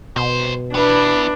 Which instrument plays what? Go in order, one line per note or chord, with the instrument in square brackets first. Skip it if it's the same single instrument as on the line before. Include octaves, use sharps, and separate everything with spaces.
[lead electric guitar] C2 C5 [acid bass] B2
[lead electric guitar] B3 E4 [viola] D4 [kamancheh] B4